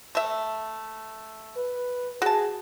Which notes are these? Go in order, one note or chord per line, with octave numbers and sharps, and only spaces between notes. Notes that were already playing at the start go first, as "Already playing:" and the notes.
A3 E5
B4
F#4 G#4 A5